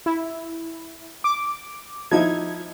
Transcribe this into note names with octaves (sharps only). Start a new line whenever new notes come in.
E4
D6
F3 D#4 E4 G#6